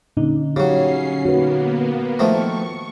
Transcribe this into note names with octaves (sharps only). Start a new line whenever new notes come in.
A#2 D3 C#4 D#4
C#3 F#3 C#4 G4 C7
A#3 B3 F#4 B4
D#3 F3 A3 C#6